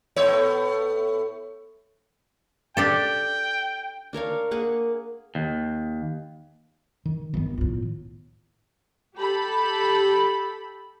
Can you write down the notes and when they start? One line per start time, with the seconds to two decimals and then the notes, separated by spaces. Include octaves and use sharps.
0.16 A2 B3 C#5
2.77 D4 G4 A4 G5
4.13 D4 A#4 C#5 F5
4.51 A#3 G#4 F#5
5.35 D#2
7.06 D#3
7.34 G1 D#3 F3 B3
7.58 A2 F4
9.16 G4 A4 B5